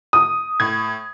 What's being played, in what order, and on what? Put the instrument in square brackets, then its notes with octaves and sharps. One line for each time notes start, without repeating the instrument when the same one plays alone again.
[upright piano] D#6
[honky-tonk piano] A2 G#6